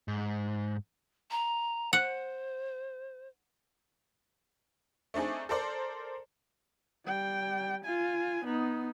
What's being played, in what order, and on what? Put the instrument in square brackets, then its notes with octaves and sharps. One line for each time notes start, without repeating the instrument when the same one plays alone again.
[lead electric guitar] G#2
[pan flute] A#5
[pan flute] C5 [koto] F#5
[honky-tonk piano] A3 C4 D4 D#4 G#4
A4 A#4 C5 D5
[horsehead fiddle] G3 G5
F4 G#5
B3 D#4